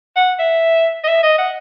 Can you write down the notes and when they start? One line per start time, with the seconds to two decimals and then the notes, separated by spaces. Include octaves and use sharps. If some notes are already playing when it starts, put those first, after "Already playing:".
0.16 F#5
0.39 E5
1.04 D#5
1.07 E5
1.23 D#5
1.38 F#5